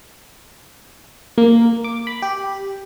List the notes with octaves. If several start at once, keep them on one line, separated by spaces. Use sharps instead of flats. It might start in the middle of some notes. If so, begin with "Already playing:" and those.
A#3
D6
B5
G4